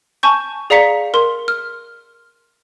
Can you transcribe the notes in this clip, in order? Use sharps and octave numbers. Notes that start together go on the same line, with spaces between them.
G#5 A5 C#6 G6
G#4 D5 F5 A#5 B6 C#7
A#4 C6
F6